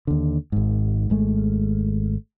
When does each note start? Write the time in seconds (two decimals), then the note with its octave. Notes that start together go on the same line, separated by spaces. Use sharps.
0.07 D#2 D3
0.52 G#1 G#2
1.10 G#1 G#3 A3